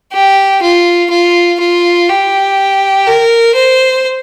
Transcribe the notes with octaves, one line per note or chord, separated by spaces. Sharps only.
G4
F4
F4
F4
G4
A#4
C5